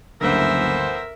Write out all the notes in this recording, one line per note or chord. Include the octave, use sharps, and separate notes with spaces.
F#1 D2 G2 E3 B3 A#4 C5 E5